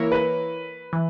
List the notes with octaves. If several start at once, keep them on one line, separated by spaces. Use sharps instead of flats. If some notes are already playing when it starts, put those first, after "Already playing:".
Already playing: E3 A#3 E4 A#4 C#5
B4
E3